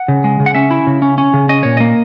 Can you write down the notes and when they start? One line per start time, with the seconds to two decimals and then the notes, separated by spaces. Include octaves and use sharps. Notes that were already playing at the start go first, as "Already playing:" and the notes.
Already playing: F#5
0.08 C#3
0.24 G#3
0.40 C#3
0.46 F#5
0.55 C#4 E5
0.71 E4
0.87 C#3
1.02 C#4
1.18 C#4
1.34 C#3
1.49 C#4 D#5
1.63 A#2 C#5
1.77 A#3 D#5